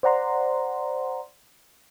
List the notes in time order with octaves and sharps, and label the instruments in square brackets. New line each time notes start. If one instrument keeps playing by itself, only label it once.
[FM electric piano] C5 D5 F#5 A#5 C6